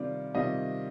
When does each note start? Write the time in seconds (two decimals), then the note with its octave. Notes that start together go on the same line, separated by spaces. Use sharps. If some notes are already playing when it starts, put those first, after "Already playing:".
Already playing: C3 D#3 G3 C4 F4 D5
0.35 C3 D#3 G3 C4 F4 D#5